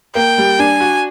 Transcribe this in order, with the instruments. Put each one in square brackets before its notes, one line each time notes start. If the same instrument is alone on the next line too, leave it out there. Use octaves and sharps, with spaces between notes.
[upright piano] A#3 [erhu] G5
[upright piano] G3
[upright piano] D4 [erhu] G#5
[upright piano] F#4